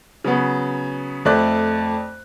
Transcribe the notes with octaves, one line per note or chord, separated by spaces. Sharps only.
C#3 F#3 B3
F2 A3 D5 F#6